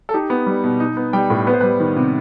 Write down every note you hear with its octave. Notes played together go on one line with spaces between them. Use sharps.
A4
D#4 G4
B3
G3
B2
D#4
B3
G3 G5
A2
B3 B4
C5
G3 B4
D#3
C3